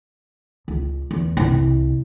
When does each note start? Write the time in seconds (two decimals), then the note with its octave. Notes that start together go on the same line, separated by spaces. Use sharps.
0.68 C#2
1.11 E2
1.37 C2